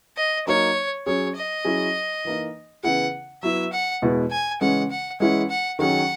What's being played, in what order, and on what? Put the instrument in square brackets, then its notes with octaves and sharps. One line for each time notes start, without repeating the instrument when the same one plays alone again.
[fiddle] D#5
[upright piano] F#3 A#3 D#4 [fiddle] C#5
[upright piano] F#3 C#4 G#4 [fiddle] C#5
[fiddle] D#5
[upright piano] F#3 C#4 E4 G#4
E3 A#3 D#4
[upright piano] C#3 E3 B3 E4 G#4 [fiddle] F#5
[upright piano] F#3 B3 E4 [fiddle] E5
[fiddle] F#5
[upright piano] E2 B2 G#3 B3 E4
[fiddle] G#5
[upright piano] C#3 E3 G#3 C#4 [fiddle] F#5
[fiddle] F#5
[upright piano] E3 G#3 C#4 E4 [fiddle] F#5
[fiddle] F#5
[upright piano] D#3 F#3 C#4 G#4 [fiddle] F#5